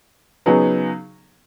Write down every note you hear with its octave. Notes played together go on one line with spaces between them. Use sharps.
C#3 F#3 B3 D#4 G#4